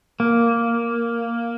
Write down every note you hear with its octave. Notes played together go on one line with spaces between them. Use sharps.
A#3